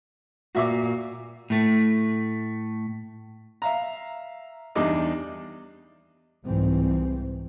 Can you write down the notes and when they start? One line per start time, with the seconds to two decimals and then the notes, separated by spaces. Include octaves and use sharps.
0.55 A#2 F#4 E5 D6
1.50 A2 A3
3.62 E5 F5 A#5
4.75 E2 G3 D4 D#4 D#5 D6
6.46 C2 G#2 E3 C4